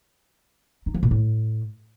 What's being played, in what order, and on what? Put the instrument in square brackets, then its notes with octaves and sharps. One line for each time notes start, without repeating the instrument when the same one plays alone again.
[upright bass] D#4
F3
A#2
A2